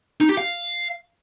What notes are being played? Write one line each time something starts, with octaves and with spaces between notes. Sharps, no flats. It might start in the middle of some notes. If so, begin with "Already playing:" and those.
D#4
G4
F5